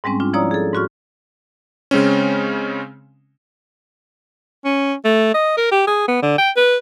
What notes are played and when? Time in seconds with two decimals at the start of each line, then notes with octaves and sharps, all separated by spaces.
0.04 G#2 G3 G#3 C4 C#4
0.20 D4 F4
0.33 F3 E4 C#5 D5 A#5 D#6
0.51 G#4 A4
0.74 G#2 F#4 C#6 F6
1.91 C#3 G#3 C4 C#4
4.65 C#4
5.05 A3
5.34 D#5
5.57 A#4
5.72 G4
5.87 G#4
6.08 B3
6.22 D3
6.38 G5
6.57 B4